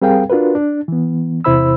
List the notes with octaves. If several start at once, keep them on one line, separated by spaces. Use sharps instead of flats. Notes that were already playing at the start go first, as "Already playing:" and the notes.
G3 C4 G#4 A#4 F5 G5
D4 F4 F#4 A#4 B4
D4
E3 B3
E2 C3 E4 C5 B5 E6